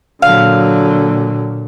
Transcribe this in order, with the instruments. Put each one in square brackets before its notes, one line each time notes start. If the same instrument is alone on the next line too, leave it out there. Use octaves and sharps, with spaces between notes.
[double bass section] A#2 [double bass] D3 F#3 [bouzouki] F5